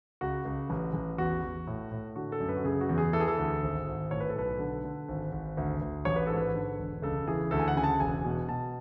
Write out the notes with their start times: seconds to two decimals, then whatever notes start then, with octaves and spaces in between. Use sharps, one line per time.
0.21 C#2 F#4
0.45 C#2
0.70 A1
0.94 A1
1.18 E2 F#4
1.43 E2
1.67 A2
1.92 A2
2.16 D3 F#4
2.32 A4
2.40 F#2
2.49 B4
2.57 F#4
2.64 C#3 G#4
2.81 F#4
2.89 E2
2.98 G#4
3.13 E3 A4
3.20 G#4
3.28 A4
3.38 D2
3.63 G#1
3.87 G#1
4.11 A2 C#5
4.20 B4
4.30 A4
4.36 B1 B4
4.59 D3
4.84 D3
5.08 G#1
5.32 G#1
5.57 D2
5.81 D2
6.05 A1 C#5
6.16 B4
6.27 G#2 A4
6.37 B4
6.55 D3
6.79 E1
7.02 C#2 A4
7.27 E3 G#4
7.51 D2 A4
7.60 G#5
7.68 F#5
7.76 C#3 G#5
7.84 A5
8.00 E1 G#5
8.24 B2
8.48 B2 A5